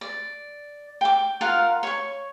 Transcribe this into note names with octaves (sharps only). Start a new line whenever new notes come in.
D5
G5 D6
F4 A#4 F5 F#5
C#5 C#6